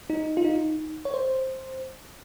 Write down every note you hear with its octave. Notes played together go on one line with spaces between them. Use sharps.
D#4
F4
D#4
C#5
C5